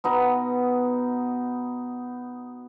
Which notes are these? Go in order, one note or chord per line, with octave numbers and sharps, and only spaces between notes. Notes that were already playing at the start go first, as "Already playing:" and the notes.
B2 B3 D#4